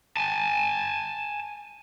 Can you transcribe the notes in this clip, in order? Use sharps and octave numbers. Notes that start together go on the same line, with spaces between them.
G#5 A5